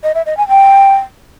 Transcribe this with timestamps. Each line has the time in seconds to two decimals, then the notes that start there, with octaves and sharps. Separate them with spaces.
0.03 D#5
0.15 E5
0.26 D#5
0.37 G#5
0.49 G5